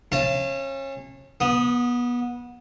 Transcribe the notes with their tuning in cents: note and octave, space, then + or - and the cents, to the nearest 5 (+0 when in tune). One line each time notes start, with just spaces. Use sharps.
C#4 -30 F5 -45 A5 +0
B3 -25 D#6 +0